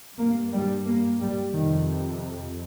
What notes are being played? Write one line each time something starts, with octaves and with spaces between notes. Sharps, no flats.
G2 A#3
G3
A#3
G3
F2 C3 D#3